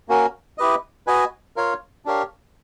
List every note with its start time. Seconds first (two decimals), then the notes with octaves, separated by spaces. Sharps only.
0.09 A#3 C#4 F#4 A#4
0.58 E4 G4 B4 D#5
1.07 F#4 B4 D#5 G#5
1.56 F4 A#4 C#5 F5
2.05 D4 G4 A#4 C#5 F5